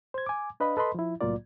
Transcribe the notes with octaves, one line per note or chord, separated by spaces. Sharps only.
C5 G#6
G#5 D6
D4 B4 D#5 F5 B5
A4 B4 D#5 B5 C6
F3 E4
C2 A2 F#3 A#3 F4 D5